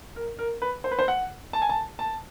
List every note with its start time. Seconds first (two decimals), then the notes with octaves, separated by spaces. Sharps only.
0.16 A#4
0.39 A#4
0.62 B4
0.84 C5
0.91 B4
0.99 C5
1.08 F#5
1.53 A5
1.62 G#5
1.69 A5
1.99 A5